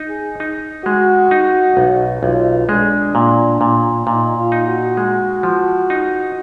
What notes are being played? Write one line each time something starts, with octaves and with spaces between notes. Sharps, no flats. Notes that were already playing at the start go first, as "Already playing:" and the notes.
Already playing: D#4
G#4
D#4
G#3 F#4
D#4
B1
B1 F4
G#3 D4
A#2
A#2
A#2 D#4
F4
D#4
F#4
G#3
F3
D#4